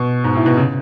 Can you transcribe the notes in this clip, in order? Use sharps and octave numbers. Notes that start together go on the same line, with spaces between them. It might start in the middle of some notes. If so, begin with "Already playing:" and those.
Already playing: B2
G#2
A2
B2
C#3